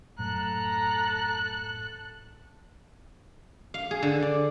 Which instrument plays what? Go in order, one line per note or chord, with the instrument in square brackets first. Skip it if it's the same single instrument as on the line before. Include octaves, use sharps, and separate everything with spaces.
[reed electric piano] F#2 A2 [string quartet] A4 F#6 [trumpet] A#5
[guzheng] F5
G#4
D3
D5